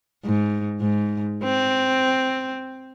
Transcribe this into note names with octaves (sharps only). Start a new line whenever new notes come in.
G#2
G#2
C4